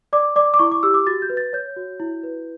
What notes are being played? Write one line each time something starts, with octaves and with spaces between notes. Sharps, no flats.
D5 D6
D5 D6
D6
E4 C#6
D6
G4 E6
D6
F#4 A6
G6
B4
A6
C#5 G6
F#4
E4
B4